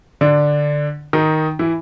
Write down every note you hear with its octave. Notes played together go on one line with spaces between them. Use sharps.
D3 D4
D#3 D#4
E3 E4